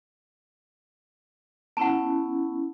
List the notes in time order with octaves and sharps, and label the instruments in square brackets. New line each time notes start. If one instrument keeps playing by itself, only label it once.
[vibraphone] B3 C#4 E4 [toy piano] F#5 A5